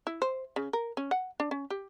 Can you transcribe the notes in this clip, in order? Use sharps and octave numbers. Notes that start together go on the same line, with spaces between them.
E4
C5
C#3
A#4
C#4
F#5
D4
C#4
G4